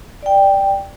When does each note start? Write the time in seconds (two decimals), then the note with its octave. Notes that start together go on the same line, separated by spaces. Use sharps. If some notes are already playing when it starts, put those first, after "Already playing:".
0.22 D5 G5